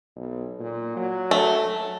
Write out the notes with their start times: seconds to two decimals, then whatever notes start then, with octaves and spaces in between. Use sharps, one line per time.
0.16 B1
0.59 A#2
0.96 F#3
1.31 A3